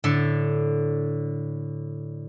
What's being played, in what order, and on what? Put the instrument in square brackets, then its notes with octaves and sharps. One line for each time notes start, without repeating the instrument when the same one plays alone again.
[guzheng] A2 D3